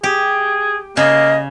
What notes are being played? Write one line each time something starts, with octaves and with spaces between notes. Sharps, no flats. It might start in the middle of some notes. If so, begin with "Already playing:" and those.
G4 G#4
C#3 A#3 D#5